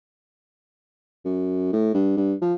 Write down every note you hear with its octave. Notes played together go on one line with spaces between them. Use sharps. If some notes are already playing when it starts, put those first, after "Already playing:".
F#2
A2
G2
G2
F3